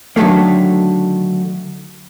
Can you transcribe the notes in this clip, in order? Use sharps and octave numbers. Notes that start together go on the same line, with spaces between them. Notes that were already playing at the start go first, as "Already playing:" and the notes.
D3 D#3 F3 F#3 A3 A#3